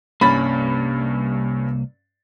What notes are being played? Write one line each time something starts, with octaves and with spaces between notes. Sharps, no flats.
C2 G2 A#3 C#4 B5 A6